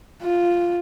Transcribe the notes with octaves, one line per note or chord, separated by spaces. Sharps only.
F4